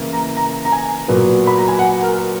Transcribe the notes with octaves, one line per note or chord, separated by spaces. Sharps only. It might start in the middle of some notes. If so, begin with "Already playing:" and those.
Already playing: C#3 E3 A#3
A#5
A#5
A#5
G#5
A#2 F#3 B3
B5
A#5
G#5
F#5
A#4